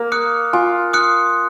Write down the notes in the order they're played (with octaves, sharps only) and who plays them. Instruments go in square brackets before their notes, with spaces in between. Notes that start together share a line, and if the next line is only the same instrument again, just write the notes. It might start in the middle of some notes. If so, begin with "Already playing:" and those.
Already playing: [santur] A#3
[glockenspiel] D#6 F#6 C#7
[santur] F4 [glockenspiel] G#5
[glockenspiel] D#6 F#6 C#7